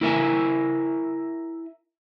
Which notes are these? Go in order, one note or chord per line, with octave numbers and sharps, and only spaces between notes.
E4 A#4 E5 G#5